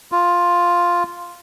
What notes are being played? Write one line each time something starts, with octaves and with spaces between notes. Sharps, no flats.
F4